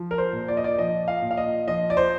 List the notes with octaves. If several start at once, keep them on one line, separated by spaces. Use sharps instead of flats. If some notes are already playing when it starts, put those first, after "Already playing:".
Already playing: F3
A#4
C5
A#2
D5
D#5
D5
F3 D#5
F5
A#2
F5
D#5
F3 D#5
D5
C5